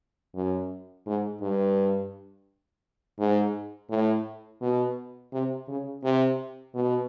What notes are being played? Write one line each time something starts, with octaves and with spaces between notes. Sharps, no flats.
F#2
G#2
G2
G#2
A2
B2
C3
C#3
C3
B2